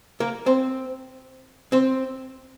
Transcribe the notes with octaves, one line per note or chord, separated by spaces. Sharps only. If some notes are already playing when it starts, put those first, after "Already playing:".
A#3 A#4
C4 C5
C4 C5